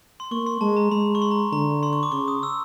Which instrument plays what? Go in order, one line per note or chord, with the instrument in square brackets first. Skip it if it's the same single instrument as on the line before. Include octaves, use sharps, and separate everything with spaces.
[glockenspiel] C6
[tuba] A#3 [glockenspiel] C#6
[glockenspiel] C6
[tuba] G#3 [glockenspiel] A5
[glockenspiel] A#5
[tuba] G#3 [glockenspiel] B5
[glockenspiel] C#6
C6
A#5
[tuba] D3 [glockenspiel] A#5
[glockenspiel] C6
C#6
D6
[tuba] C#3 [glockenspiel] C#6
[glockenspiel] D#6
E6